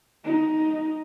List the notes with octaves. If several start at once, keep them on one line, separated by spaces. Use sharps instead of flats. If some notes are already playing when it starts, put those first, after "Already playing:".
D#4